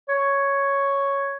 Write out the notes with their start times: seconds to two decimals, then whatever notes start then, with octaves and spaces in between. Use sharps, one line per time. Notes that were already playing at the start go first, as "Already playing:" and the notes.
0.09 C#5